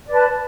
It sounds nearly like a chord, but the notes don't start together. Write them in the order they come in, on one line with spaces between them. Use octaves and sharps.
D5 B4 A5